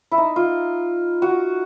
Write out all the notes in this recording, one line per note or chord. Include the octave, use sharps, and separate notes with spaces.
E4
D#4
F4
F#4